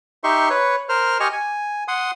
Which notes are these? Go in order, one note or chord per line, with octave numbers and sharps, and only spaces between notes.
D#4 G4 E5 C6 C#6
B4 C#5
A#4 C5 F6
G4 D#5 G#5 C#6 F6
G#5
F#5 C6 D#6